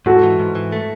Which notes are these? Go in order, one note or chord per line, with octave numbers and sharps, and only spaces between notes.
G#2 F#4 A4
E3
G#2
E3
A3